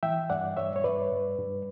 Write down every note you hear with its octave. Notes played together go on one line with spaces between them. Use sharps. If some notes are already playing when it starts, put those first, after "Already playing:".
E3 E5 G5
G2 D5 F#5
G2 C#5 E5
C#5
G2 B4 D5
G2
G2